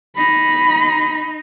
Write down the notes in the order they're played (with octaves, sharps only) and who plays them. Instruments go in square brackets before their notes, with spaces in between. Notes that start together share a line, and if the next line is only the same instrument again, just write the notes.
[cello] D#4 [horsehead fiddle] B5